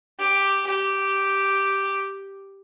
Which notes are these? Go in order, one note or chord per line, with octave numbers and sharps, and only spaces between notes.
G4
G4